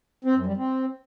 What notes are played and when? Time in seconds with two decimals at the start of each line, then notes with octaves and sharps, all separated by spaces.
0.24 C4
0.35 F#2
0.46 G3
0.57 C4